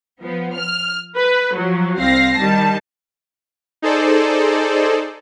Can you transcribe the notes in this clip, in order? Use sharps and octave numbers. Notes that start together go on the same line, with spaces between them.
F3 B3
F6
B4
F3 F#3
C2 C4 F5 A#6 C7
D#3 G3 A5
D#4 G#4 A4 C5 D5